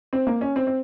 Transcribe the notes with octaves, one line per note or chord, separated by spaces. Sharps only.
C4
A#3
C#4
C4
C4